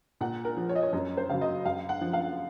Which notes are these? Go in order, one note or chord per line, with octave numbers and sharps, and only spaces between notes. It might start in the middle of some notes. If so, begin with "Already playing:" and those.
A#2 F#5
A#4
F3
C#5
D#5
C#5
F#2 C#5
C5
C#3 F#3 F5
D#5
F#2 F5
F#5
F3
F5